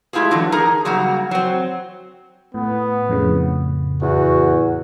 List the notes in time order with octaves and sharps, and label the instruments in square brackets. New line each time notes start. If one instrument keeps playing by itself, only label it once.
[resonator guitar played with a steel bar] G#3 A3 E4 F4 G4 G#4
D3 E3 F#3 D4
D#4 G#4 A#4 A#5
C#3 F#3 G3 A#3 F#4
F#3 C4
[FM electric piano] A2 [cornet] B3
[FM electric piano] F2 A2 C#3
[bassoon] E2 [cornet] F#4